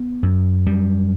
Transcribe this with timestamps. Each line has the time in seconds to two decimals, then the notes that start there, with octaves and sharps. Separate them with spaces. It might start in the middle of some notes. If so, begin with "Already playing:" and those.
Already playing: B3
0.23 F#2
0.66 F#2 G3